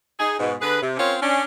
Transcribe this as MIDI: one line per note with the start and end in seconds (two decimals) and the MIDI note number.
0.19 0.34 63
0.19 0.34 68
0.39 0.54 44
0.39 0.54 47
0.61 0.79 50
0.61 0.79 68
0.61 0.79 71
0.82 0.96 48
0.97 1.16 60
0.97 1.16 61
0.97 1.16 65
0.97 1.16 70
0.97 1.16 73
1.22 1.44 61
1.22 1.44 62